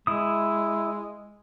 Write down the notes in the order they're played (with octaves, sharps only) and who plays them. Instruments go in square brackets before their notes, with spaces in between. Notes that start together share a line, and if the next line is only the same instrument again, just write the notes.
[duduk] G#3 [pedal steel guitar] E4 D#6